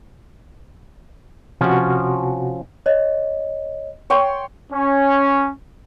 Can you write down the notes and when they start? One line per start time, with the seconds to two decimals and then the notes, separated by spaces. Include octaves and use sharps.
1.61 C3 F3 C#4 F#4
2.86 C#5 D#5
4.10 C#5 G5 C6
4.73 C#4